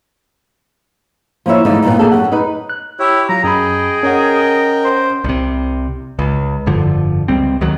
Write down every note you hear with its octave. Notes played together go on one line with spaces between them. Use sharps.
F3 A#3 E4 C#5 E5
F2 G#2 D3 E3 A3 D#4
G2 A#2 B3
A#3 D4 G#4 A4
F#2 G4 F#5
D#4 B4
F#6
E4 G4 C#5
F#3 F4 A#5
F#2 G#4 D#5 G5 B5
C#4 A#4 C#5 D#5 F#5 G5
C5
C2 C3
C#2
F1 G2 D3 F3
C#2 G3 C4
D2 D#3 F#3